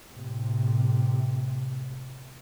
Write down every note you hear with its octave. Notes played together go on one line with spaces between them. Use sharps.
A2 C3